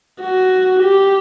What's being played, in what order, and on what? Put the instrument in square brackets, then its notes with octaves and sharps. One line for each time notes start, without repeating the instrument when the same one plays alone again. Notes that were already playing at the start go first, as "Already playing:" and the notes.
[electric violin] F#4
G4